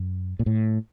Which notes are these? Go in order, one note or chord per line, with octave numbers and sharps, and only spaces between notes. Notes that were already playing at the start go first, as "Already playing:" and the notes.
Already playing: F#2
A#2
A2